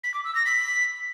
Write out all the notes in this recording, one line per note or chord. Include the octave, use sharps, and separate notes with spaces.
B6
D6
E6
A#6
B6